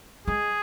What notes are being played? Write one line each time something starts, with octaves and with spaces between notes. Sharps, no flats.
G#3 G#4